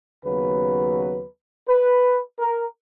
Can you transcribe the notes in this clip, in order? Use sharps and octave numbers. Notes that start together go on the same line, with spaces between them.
D#2 C#3 F#3 B3 B4
B4
A#4